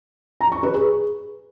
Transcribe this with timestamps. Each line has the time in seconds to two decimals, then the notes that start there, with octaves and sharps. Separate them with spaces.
0.41 A#5
0.52 C#6
0.63 B4
0.74 G#4